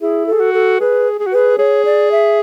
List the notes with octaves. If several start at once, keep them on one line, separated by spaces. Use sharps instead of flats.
E4 G#4
A4
G#4
F#4
A4
G#4 B4
G#4
F#4
G#4 B4
G#4 C#5
D5
E5